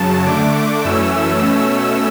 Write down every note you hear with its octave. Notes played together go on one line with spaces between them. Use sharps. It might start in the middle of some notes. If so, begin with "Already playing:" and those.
Already playing: F#2 C#3 F#3 A5
D3 A3 D4 D6
F#2 E3 A3 C#4 E6
B2 A3 C#4